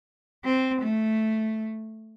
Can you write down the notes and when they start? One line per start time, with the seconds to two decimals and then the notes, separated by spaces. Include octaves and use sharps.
0.44 C4
0.82 A3